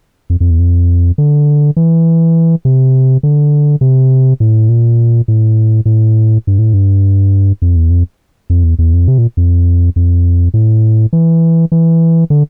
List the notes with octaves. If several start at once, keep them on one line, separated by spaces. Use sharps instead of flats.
F2
F2
E2
F2
D3
E3
C3
D3
C3
A2
A#2
A2
A2
G2
A2
G2
F2
E2
F2
F2
E2
E2
F2
C3
A#2
F2
F2
A2
E3
E3
D3